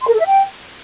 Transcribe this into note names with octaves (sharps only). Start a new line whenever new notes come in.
C6
A#4
A4
E5
G5